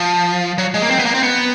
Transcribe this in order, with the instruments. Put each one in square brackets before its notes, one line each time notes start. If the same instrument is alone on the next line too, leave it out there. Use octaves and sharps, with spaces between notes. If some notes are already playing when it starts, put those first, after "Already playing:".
Already playing: [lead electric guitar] F3
F#3
G#3
A#3
C4
B3
A#3
C4
B3